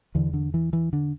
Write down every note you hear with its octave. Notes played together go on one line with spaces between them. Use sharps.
E2 D3 E3
D3
E3
E3
D3